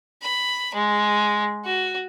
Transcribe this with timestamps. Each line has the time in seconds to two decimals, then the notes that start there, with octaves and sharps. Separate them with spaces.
0.22 B5
0.74 G#3
1.65 F#4